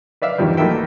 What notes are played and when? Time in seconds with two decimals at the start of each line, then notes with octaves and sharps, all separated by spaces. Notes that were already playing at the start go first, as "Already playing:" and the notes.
0.22 B4 D5 E5 F5
0.38 E2 G2 D#3 F3 G3
0.57 B1 A3 A#3 D#4 E5 G5